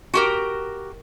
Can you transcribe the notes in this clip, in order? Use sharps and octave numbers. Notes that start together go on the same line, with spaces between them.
F#4 G4 A#4